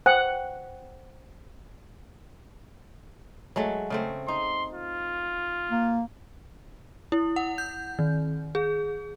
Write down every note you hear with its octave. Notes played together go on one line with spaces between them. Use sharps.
C5 F#5 G5
F#3 G#3 A3
C#3 A3 C4
D#4 C6
F4
A#3
E4
F#5
G6
D#3
G#4